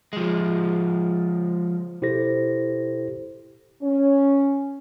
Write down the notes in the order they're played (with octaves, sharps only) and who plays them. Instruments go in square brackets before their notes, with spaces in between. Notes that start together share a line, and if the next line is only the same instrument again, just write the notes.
[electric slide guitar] F3 G#3
[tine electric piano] B2 E4 G4 A4 C5 A#6
[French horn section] C#4